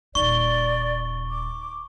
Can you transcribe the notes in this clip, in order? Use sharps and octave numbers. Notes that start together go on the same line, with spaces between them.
D#1 D#4 D5 C#6 G7
D6